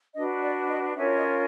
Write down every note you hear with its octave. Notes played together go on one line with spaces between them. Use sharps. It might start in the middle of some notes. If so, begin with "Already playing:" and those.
D4 F#4 B4 D#5
D5
D#5
C#4 F4 A#4 C#5 E5
D#5